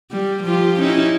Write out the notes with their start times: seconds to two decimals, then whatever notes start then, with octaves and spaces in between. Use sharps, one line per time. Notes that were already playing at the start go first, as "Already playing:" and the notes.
0.11 G3
0.43 F3 F4 G4
0.79 C#4 D#4 E4